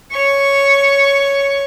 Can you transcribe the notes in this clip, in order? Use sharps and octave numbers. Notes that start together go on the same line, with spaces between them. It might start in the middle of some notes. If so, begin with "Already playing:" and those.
C#5 C#6